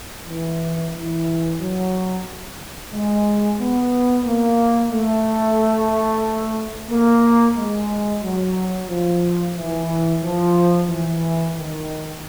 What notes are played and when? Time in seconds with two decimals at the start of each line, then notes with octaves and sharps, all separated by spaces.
0.28 E3
0.95 E3
1.60 F#3
2.93 G#3
3.60 B3
4.25 A#3
4.92 A3
6.90 A#3
7.57 G#3
8.23 F#3
8.89 F3
9.56 E3
10.22 F3
10.88 E3
11.55 D#3